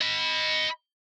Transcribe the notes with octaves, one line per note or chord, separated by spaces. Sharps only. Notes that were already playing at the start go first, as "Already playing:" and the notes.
D#5 B5